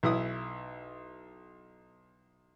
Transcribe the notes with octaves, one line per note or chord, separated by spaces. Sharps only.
B1 E4 D#6